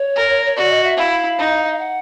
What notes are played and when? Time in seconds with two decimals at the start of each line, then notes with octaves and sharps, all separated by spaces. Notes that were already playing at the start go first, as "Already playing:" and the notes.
Already playing: C#5
0.16 A#4
0.45 C#5
0.56 F#4 D5
0.70 D#5
0.83 E5
0.97 E4 F5
1.38 D#4
1.71 F5
1.79 F#5